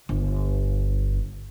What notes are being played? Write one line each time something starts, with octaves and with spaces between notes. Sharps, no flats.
G1